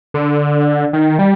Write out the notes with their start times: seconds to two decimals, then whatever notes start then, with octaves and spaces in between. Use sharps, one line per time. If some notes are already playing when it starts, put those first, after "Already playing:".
0.14 D3
0.93 D#3
1.19 G3